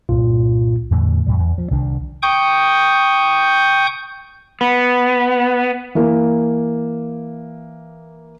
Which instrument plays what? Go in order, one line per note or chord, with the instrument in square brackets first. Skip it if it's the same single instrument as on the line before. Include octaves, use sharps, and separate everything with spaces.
[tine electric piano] C2 G2 A#2 F4
[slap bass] E2 A2 D3
F2 A2 G3
E2
F3
C2 D#3 D4
[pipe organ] G5 C#6 D#6 G6
[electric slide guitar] B3
[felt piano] E3 A#3